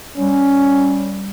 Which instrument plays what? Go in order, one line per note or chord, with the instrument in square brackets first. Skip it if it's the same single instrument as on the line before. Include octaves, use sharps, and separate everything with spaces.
[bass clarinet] G3 [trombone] C#4